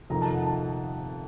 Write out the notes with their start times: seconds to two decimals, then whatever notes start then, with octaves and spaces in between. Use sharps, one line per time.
0.10 F2 C3 D#3 A#3 A#5
0.22 A5
0.34 F#5
0.46 A5